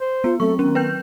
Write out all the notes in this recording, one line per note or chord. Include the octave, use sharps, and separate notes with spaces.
C5
B3 F4
F#3 A3 C4 A4 C#6
D#3 B3 C#4 A#4
B4 G5 G6